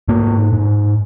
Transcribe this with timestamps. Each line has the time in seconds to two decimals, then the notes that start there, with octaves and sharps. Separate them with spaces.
0.08 G#2 A#3
0.53 G#2